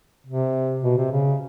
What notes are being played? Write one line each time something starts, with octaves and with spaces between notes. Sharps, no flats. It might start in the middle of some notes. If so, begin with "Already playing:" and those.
C3
B2
C3
C#3